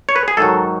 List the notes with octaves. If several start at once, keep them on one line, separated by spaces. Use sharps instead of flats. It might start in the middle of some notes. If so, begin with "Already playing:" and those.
C#5
B4
G#4
G#2 D#3 F#3 A4